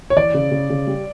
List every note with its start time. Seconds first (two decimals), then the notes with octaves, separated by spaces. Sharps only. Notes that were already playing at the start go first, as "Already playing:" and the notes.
0.10 C#5
0.16 E3 D5
0.34 C#3
0.51 C#3
0.70 C#3
0.87 G3